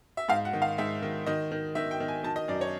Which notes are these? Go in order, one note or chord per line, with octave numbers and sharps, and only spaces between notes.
E5
G#2 F5
F#5
D#3
F5
G#2 E5
D#3
D#3 D#5
D#3
D#3 E5
G5
D#3
G#5
D#3 A5
D#5
F#2 D5
C#5